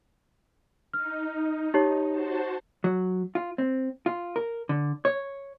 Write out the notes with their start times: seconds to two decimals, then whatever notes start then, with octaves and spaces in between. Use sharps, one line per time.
0.93 D#4 F6
1.74 D#4 G4 C#5
2.10 F#4 C5 A5
2.84 F#3
3.35 F4
3.58 C4
4.06 F4
4.36 A#4
4.69 D3
5.05 C#5